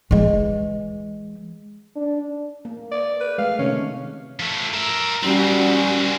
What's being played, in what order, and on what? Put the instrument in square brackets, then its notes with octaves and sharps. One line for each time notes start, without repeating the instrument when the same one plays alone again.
[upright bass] E3 G#3
[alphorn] D4
[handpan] A#3
[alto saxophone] D5
B4
[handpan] G#3 A3 [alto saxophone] F5
[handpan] C3 D#3 [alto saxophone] C#4
[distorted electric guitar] F3 A3
A#4 E5
[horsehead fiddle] G3 F#4 [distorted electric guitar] A#3 C4 [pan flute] C#4